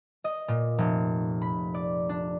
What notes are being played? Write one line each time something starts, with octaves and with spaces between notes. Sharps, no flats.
D#5
A#2
F1
B5
D5
D4